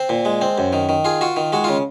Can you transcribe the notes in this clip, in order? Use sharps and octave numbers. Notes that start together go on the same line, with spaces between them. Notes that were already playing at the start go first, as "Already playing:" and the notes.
Already playing: C4 C5
A#2
G#3
C4
F#2
D#3
D#3
F4 G#4
F4 F#4
D#3
G#3 F#4
C#3 F4